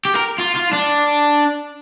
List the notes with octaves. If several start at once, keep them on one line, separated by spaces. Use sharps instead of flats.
G4
A#4
F4
F4
D4